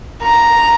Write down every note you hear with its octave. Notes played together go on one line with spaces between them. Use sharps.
A#5